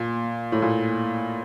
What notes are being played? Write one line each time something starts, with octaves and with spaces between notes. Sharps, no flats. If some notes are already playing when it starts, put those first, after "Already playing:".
Already playing: A#2
A2
A#2